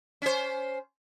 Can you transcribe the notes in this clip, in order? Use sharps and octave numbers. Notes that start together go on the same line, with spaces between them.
C#4 C5